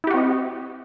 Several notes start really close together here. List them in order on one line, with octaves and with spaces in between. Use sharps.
E4 G4 F#4 C4 D#5